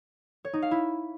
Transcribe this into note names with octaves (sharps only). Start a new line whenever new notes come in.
C#5
D#4
F5
E4